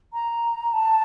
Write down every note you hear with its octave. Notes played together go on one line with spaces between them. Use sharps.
A#5
A5